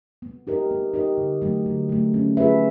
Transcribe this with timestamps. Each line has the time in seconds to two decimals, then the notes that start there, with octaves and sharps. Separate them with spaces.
0.22 B3
0.47 D#4 G4 A#4 D#5
0.71 B3
0.94 D#4 G4 A#4 D#5
1.18 D3
1.42 F#3 A3
1.66 D3
1.89 F#3 A3
2.14 C#4
2.37 F4 G#4 B4 E5